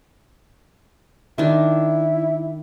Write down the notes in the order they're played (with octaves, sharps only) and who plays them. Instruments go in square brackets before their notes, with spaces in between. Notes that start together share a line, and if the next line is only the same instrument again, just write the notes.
[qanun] D#3 D4 [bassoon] E4